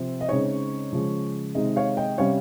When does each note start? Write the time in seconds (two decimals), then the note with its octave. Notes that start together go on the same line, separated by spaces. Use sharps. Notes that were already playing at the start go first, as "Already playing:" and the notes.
Already playing: C3 F3 C4
0.21 D#5
0.28 C#3 G#3 C4 D#4 C#5
0.93 C#3 F3 G#3
1.55 C3 D#3 G#3 C4 D#4 D#5
1.76 C#5 F5
1.97 D#5 G5
2.18 C3 G3 C#4 C#5 F5